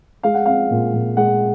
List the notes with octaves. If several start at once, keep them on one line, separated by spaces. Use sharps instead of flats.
G#3 F5
F#5
C4 F5
A#2
A#2
G#3 F#5